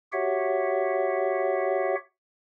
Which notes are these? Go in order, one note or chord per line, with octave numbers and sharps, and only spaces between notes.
F#4 G4 C#5 E5 F#5